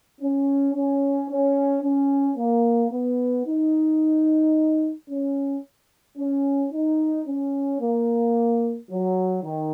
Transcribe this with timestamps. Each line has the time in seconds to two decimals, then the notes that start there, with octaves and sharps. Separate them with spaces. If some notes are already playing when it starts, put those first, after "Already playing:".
0.21 C#4
0.75 C#4
1.29 C#4
1.82 C#4
2.37 A#3
2.92 B3
3.46 D#4
5.09 C#4
6.17 C#4
6.72 D#4
7.26 C#4
7.80 A#3
8.90 F#3
9.43 D#3